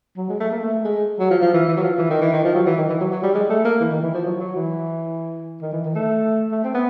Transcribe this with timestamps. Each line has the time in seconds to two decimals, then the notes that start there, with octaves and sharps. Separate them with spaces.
0.17 F#3
0.29 G#3
0.40 A3
0.52 A#3
0.63 A3
0.85 G#3
1.20 F#3
1.31 F3
1.42 F3
1.54 E3
1.68 E3
1.77 F#3
1.83 F3
1.98 E3
2.10 D#3
2.22 E3
2.33 D#3
2.44 F3
2.55 F#3
2.66 E3
2.78 D#3
2.89 E3
3.01 F#3
3.12 F#3
3.23 G3
3.35 G#3
3.49 A3
3.65 A#3
3.80 E3
3.91 D#3
4.03 E3
4.14 F3
4.25 F#3
4.40 F#3
4.56 E3
5.62 D#3
5.73 E3
5.84 D#3
5.95 A3
6.52 A3
6.64 C4
6.74 B3